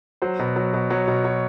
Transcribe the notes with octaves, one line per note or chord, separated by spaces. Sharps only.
F#3 C5
B2
F#3
B2
F#3 C#5
B2
F#3 C#5